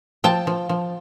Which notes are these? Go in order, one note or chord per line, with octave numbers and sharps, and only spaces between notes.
F3 G5 A5
F3
F3